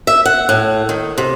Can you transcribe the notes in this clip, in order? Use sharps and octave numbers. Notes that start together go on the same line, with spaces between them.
E5
F#5
A2
D#3
C3